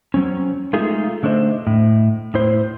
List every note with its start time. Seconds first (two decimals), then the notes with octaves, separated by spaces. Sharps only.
0.14 F#3 C4 C#4
0.73 G#3 A3 D#4 F4 G#4 A4
1.23 D3 A3 D4 C5 D#5
1.67 A2
2.34 A2 E4 C5